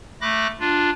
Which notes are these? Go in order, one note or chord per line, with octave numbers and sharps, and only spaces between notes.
A3 B5 D6 F#6 A#6
D4 F4